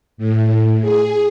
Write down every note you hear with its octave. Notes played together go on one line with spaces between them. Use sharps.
A2
G#4